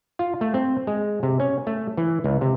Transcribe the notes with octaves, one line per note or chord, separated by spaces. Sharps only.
F4
A3
C4
G#3
C3
C#4
A3
E3
C#2
C3